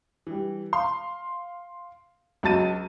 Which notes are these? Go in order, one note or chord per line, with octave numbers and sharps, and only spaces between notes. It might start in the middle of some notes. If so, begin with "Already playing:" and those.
E3 G3
F5 C6
C#2 F#3 A5 A6 D#7